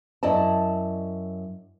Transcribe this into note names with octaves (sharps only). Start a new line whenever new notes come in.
F#2 E4 D5 D#5 A5